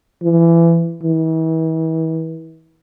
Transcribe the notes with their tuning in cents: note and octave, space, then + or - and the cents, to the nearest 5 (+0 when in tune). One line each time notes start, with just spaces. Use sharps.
E3 +25
E3 -40